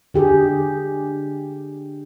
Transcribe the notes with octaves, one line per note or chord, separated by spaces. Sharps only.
D3 G4 G#4